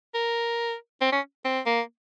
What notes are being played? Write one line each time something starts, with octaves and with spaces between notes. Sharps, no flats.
A#4
C4
C#4
C4
A#3